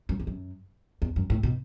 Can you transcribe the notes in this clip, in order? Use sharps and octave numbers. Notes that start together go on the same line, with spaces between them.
F#2
E2
F#2
E2
F#2
A2
B2